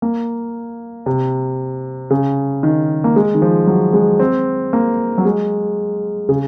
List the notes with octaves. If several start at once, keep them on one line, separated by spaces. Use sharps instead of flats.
A#3
C3
C#3
D#3
A#3
G#3
D#3
F3
F#3
G#3
C4
A#3
F#3
G#3
C#3